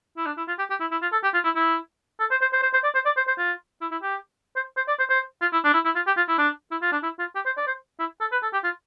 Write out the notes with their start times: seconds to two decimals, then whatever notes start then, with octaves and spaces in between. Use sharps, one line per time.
0.17 E4
0.26 D4
0.37 E4
0.48 F4
0.59 G4
0.70 G4
0.80 E4
0.91 E4
1.02 F4
1.12 A4
1.24 G4
1.34 F4
1.44 E4
1.56 E4
2.20 A4
2.31 C5
2.41 C5
2.53 C5
2.63 C5
2.73 C5
2.84 D5
2.95 C5
3.06 D5
3.17 C5
3.28 C5
3.38 F4
3.81 E4
3.92 E4
4.02 G4
4.56 C5
4.77 C5
4.88 D5
4.99 C5
5.10 C5
5.42 F4
5.53 E4
5.64 D4
5.74 E4
5.85 E4
5.95 F4
6.07 G4
6.17 F4
6.28 E4
6.38 D4
6.71 E4
6.82 F4
6.92 D4
7.03 E4
7.19 F4
7.35 G4
7.46 C5
7.57 D5
7.67 C5
7.99 E4
8.21 A4
8.32 B4
8.43 A4
8.53 G4
8.64 F4